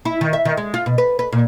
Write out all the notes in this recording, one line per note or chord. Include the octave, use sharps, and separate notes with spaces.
E4
D#3
E5
D#3
G#3
F4
B2
B4
B4
A#2